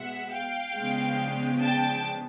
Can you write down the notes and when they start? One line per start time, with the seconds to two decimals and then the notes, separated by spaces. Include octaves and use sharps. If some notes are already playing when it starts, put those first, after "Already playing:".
Already playing: B2 G#3 B3 E5 F#5
0.32 F5 G5
0.75 C#3 F3 G#3 B3 D4
1.61 G5 A5